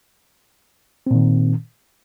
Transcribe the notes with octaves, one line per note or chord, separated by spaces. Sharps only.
A#2 D#3 C4